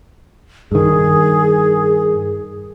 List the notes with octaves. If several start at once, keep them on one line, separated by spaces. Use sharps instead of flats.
G2 D#3 G#4